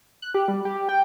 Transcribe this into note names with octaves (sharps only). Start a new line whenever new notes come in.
F#6
G4
G3
G4
G5